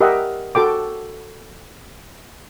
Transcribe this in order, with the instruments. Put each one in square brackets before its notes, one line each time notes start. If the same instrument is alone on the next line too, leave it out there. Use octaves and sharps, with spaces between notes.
[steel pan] G4 A#4 D#5 E5 F#5
F#4 A4 G5 D6